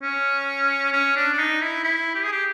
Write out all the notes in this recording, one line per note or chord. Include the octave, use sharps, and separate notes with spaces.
C#4
C#4
D4
D4
D#4
E4
E4
G4
G#4
G4